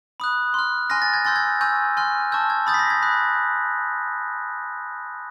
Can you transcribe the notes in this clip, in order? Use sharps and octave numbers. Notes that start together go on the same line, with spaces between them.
B5 D#6 F#6
C6 F6
G#5 C6 F6 A#6
A6
G#6
G#5 C6 E6 G6 A6
G#6
G#5 C#6 E6 G6
G#5 C6 F6
A5 C#6 E6 G6
G#6
B5 D#6 G6 A6
B6
A#6
G#6
B5 D#6 F#6